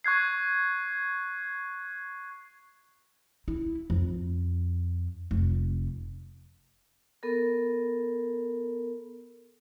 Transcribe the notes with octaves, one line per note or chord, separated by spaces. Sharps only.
C#6 F#6 G#6 C7
E4
F2
F1
B3 A4 A#4